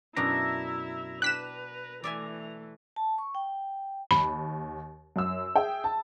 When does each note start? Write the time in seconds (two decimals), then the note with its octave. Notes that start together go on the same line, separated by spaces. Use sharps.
0.16 F#2 B2 D4 E4 E5 A#5
1.22 D4 B4 G5 A5 F#6 B6 E7
2.04 E3 A3 D5 E5 G#5
2.96 A5
3.18 C#6
3.35 G5
4.11 D#2 B5
5.16 F#2 E6
5.55 G#4 E5 G5
5.84 A5